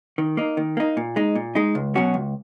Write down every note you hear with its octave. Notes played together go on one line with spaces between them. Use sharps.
D#3
A#3 D#4
D#3
A#3 D#4
A#2
G#3 D#4
A#2
G#3 D#4
C#2
B2 F#3 C#4 F#4
C#2